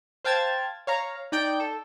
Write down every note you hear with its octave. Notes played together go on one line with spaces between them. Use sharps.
C5 F5 G5 A5 G#6 A6
C#5 F5 A#5
D#4 D5 G5 G6 D7
A4